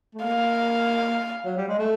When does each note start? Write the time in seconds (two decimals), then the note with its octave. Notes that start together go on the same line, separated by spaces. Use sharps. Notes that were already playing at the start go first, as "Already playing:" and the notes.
0.14 A3
0.24 A#3 F5
1.45 F#3
1.57 G3
1.68 G#3
1.79 A3